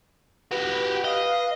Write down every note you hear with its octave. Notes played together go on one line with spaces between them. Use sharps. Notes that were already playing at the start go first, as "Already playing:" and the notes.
F#4 G4 B4
D#5 F5